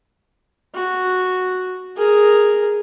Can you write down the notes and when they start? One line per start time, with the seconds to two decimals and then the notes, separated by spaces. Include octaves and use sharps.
0.75 F#4
1.97 G#4 A#4